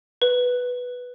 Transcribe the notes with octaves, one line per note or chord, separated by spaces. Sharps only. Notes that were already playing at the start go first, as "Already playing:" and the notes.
B4